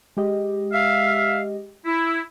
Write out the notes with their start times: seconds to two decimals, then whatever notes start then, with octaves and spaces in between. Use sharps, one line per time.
0.17 G#3 G4 D#5
0.72 E5 F5
1.85 E4